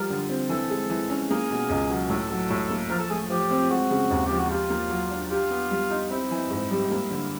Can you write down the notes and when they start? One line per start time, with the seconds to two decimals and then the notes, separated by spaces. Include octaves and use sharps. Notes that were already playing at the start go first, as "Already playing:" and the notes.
Already playing: F3 G3 F4 A#4
0.10 D3
0.29 C4
0.49 E3 A4
0.70 G#3
0.90 E3
1.10 C#4
1.30 A#3 G#4
1.50 B2
1.69 C#2
1.90 F#3
2.10 A2 A4
2.31 F#3
2.50 A2
2.70 A#3
2.90 F3 A#4
3.00 A4
3.10 A3 G#4
3.30 F3 G4
3.50 C4
3.70 G#3 F#4
3.91 C#3
4.11 D#2
4.26 F3 G4
4.38 F#4
4.50 F4 G4
4.70 A#3
4.90 F#3
5.11 D4
5.31 F4 G4
5.51 B3
5.71 G3
5.90 D#4
6.10 C4 E4
6.31 E3
6.50 G#2
6.71 G3
6.91 A#3
7.11 D3